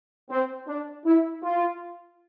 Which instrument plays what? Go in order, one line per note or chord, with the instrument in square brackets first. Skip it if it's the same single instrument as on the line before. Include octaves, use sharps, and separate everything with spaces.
[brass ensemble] C4
D4
E4
F4